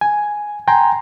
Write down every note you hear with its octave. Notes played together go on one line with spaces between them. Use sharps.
G#5
G5 G#5 A#5 C6